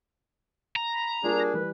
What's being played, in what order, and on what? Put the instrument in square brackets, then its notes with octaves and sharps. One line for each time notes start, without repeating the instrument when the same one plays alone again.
[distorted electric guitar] A#5
[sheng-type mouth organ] B5
[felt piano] G3 A#3 F4 [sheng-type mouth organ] D4 G#4 [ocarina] A#4
[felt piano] E3 G3 [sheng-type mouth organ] B4